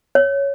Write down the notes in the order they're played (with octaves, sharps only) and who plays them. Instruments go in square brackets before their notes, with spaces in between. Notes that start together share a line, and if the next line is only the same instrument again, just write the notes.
[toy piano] C#5